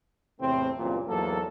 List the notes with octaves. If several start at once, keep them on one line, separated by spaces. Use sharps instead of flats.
E2 A2 C3 A3 C4
C#2 G2 A#2 E3 F#3 C4
E2 G#2 F#3 A#3 A4